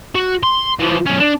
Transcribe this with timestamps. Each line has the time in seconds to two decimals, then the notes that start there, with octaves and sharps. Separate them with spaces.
0.15 F#4
0.43 C6
0.79 E3 F3
1.06 B1 C#4
1.20 D4